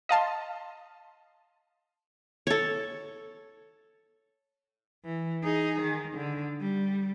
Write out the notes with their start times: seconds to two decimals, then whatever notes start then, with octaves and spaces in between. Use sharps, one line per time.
0.09 D#5 F5 A5 C6
2.47 A4 C#5
5.04 E3
5.43 D#4 G#4
5.82 D#3
6.15 D3
6.61 G3